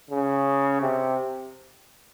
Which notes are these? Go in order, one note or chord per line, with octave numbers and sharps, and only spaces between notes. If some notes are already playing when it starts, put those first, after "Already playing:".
C#3
C3